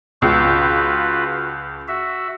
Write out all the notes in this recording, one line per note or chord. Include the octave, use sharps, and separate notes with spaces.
C#2 F4 F#4 B4
F#4 E5